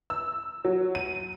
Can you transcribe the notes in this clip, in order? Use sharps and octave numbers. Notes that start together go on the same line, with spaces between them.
E6
F#3
D#7